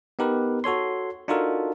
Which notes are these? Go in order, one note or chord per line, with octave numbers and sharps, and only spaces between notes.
B3 D#4 G4 A#4 B4
F#4 A4 C#5 C6
D4 D#4 F4 F#4 A4 A#4